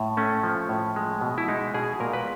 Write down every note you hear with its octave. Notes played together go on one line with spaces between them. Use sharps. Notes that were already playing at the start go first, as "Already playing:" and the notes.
Already playing: A2
A3 C#4
F3
A2
G#3
B2
E4
G#3 D#4
B2 G#4
A#2 A#4
B4